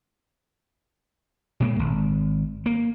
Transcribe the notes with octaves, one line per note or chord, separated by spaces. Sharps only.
A#2 G#3 A#3
G#1
A#3